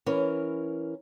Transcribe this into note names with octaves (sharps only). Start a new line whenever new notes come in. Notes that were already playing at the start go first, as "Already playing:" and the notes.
E3 C#4 A#4